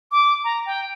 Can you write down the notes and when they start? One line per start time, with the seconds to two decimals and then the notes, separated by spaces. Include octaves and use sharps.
0.12 D6
0.44 A#5
0.66 G5